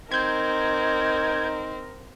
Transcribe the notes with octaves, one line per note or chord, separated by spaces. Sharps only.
C4 D#4 A#4 G6 G#6